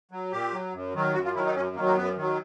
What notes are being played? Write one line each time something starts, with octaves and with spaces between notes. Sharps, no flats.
F#3
A#2 G4
F#3
F#2
D#3 F#3
F#2 F#4
F4
D#3 F#3 E4
D#4
F#2 C#4
D#3 F#3 A#3
A#3
F#2 B3
D#3 F#3